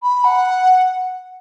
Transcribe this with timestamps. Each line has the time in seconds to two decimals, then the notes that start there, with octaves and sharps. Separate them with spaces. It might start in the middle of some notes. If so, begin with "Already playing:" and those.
0.03 B5
0.24 F#5